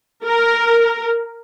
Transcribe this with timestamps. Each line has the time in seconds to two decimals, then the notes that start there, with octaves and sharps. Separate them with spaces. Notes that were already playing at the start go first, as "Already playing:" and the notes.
0.24 A#4